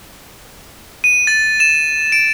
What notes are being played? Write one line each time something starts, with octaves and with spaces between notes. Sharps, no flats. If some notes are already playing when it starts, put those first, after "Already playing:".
D#7
A6
E7
D7